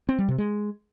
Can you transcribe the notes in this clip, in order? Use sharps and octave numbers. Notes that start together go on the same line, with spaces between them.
C4
G3
C3
G#3